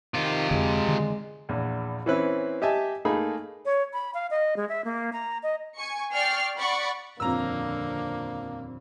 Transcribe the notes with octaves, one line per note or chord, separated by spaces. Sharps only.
C3 D#3 F4
F2 D3 G#3
D3 D#3
A#1 E2
E3 C4 C#4 E4 B4
G4 D#5 E5 G#5 A5
A3 A#3 D#4 G#4 B5
C#5
B5
F5
D#5
G#3
E5
A#3
A#5
D#5
G#5 C#6 C#7
D5 G5 C#6 F6 C7
D5 F#5 B5 C#6
D#1 F2 D3 A#3 A#5 E6